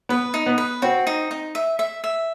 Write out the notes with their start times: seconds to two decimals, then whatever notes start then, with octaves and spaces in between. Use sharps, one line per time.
0.09 B3 B4
0.34 D#4
0.46 B3
0.58 B4
0.82 C4 F#4
1.07 D#4
1.31 D#4
1.55 E5
1.79 E5
2.04 E5